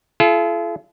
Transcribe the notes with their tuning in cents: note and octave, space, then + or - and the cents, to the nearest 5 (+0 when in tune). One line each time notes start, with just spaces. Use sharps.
F4 -40 A4 -40